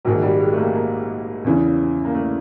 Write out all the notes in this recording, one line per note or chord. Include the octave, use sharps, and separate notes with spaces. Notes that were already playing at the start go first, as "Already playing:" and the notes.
A#1 G#2 D#3 F#3
G3
G#3
A3
A#3
A#3
E2 C#3 E3
A#3
A3